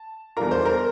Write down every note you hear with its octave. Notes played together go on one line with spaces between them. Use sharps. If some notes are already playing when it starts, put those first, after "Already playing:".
Already playing: A5
E2 E3 G3 D4 F4 A#4 A#5
C5 C6
A#4 A#5